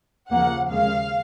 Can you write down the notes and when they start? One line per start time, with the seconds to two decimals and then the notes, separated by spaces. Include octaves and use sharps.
0.30 D#2 C#3 F3 A#3 F#5
0.70 D#2 C#3 G#3 F5